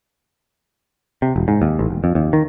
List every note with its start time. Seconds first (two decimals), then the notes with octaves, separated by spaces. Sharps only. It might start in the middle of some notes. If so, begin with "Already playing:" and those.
1.22 C3
1.36 E1
1.48 G#2
1.62 D#2
1.79 A1
1.90 E1
2.04 F2
2.15 D#2
2.33 D#3